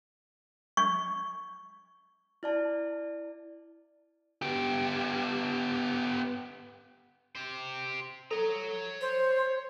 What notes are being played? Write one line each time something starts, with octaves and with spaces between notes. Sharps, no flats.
C#6
E4 D5 A5
B3 G4
G4 C5
A4 C#5 A#5
C5